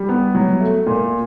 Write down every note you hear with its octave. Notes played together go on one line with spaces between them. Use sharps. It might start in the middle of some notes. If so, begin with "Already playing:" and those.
Already playing: G3
B3
F#3
A3
A#2